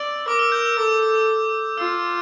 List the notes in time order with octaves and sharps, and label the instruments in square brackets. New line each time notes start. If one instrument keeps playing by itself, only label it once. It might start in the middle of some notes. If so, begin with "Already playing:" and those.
Already playing: [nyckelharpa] D5 [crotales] E6
[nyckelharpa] A#4 [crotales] D6
[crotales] E6
G6
E6
[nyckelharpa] A4 [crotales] D6
[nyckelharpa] F4 [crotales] E6